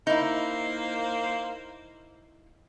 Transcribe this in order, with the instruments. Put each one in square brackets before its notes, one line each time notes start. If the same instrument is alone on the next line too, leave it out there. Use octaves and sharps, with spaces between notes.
[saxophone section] A#3 C5 [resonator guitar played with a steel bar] D#4 E4